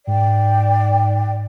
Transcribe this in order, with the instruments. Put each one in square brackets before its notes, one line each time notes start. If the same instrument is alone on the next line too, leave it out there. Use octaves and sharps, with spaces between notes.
[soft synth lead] G#2 [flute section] D5 G5